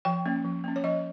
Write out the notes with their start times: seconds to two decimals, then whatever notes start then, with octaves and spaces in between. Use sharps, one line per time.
0.05 F3 G5
0.26 A#3 C#4
0.44 F3
0.64 A#3 C#4
0.76 C#5
0.84 F3 D#5